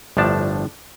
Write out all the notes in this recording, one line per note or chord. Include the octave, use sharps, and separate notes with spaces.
G1 A2 F3 D4 A5